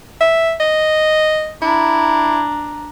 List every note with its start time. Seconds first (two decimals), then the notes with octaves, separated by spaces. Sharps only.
0.21 E5
0.60 D#5
1.61 D4 E4 A#5